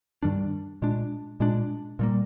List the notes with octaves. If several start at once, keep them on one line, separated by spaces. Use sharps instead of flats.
G2 D#3 G3 D4
A#2 G#3 D4
A#2 G#3 D4
A#2 G3 A#3